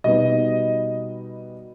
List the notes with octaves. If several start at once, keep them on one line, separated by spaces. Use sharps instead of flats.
B2 G3 B3 D#4 D#5